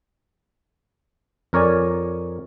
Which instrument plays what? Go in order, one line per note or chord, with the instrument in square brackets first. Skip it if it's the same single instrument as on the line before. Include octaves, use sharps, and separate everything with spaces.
[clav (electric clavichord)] F2 A#4 C#5 D5 G#5